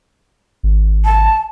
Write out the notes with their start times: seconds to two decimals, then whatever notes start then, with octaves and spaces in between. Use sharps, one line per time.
0.63 G#1
1.05 A5